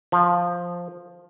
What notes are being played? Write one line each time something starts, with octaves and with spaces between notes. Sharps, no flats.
F3